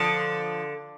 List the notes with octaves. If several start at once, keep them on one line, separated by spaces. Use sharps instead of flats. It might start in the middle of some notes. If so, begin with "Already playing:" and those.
Already playing: D3 F3